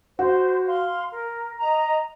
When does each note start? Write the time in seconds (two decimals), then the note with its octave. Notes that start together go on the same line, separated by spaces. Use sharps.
0.18 F#4 C5
0.66 F5 C6
1.12 A#4
1.58 D#5 A#5